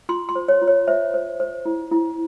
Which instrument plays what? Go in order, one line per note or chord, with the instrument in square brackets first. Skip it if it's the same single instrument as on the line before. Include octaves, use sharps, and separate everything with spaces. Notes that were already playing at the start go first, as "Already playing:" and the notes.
[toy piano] F4 C6
C6
C5
C#5
F4
C#5
C5 E5
C5
C5
E4
E4